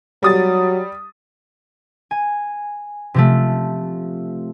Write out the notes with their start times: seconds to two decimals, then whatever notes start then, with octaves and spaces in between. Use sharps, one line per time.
0.23 F#3 G3 D#6 A6
2.11 G#5
3.14 C3 F3 A3